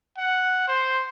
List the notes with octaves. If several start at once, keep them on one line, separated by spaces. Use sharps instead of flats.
F#5
C5